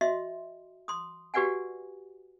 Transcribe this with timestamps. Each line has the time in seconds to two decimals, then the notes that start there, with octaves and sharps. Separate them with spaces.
0.01 F#4 D#5 E5 C6
0.88 C6 D#6
1.34 F#4 G4 B4 D5 F#5 G#5